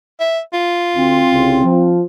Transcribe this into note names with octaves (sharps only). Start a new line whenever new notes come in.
E5
F4
D2 C4
C2 C#3
F3